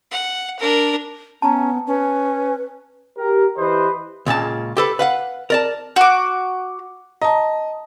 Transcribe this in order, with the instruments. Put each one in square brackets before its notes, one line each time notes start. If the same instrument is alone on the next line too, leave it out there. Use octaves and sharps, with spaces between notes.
[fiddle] F#5
D4 A#4
[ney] B3 [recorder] C#4 [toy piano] A5 A#5
[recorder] C#4 [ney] B4
[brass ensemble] G4 A#4
E3 G4 B4 C5 D#5
[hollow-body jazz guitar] C#2 A#2 C#3 A5
G4 A4 B4
B4 F5 F#5
A#4 D5 A5
[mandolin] F#4 D6
[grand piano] D#5 [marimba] A5 A#5